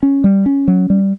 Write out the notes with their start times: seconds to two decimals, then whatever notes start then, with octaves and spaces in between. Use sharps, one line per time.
0.03 C#4
0.24 G3
0.46 C#4
0.68 F#3
0.90 G3